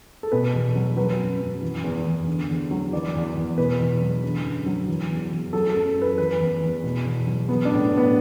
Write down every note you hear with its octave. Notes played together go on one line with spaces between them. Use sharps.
A4
B2 B4
E2
F#3
F#3 B4
F#2
F#2
E3
E2
E2
D3
E2
F#3
E3 D5
E2
E2
B2 B4
E2
F#3
D3
F#2
F#3
E3
E2
E2
F#3 A4
A4
F#2
F#2 B4
E3 B4
E2
E2
B2
E2
F#3
F#3 B3
D4
A2
A2
B3